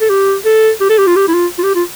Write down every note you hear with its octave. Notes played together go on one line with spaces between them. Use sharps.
A4
G4
A4
G4
A4
G4
F4
G4
E4
F4
F4
G4
F4